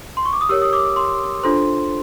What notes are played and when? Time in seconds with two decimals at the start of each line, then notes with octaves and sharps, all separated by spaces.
0.17 C6
0.25 C#6
0.33 D6
0.41 D#6
0.49 G4 A#4 C#5 E6
0.62 D#6
0.73 D6
0.96 C6
1.43 D4 F4 A4 C5 C6